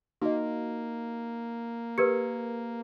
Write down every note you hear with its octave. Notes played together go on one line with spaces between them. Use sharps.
A#3 D#4 F#4 D#5 F5
G4 A#4 B4 G#6 C#7